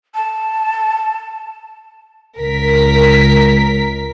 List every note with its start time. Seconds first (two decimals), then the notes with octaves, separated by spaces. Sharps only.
0.14 A5
2.37 C#2 A#4 B6